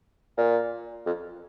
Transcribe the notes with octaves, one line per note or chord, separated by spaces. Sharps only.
A#2
F2